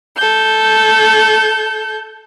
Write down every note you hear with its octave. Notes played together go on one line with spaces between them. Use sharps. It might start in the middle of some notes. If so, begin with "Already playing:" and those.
A4 G6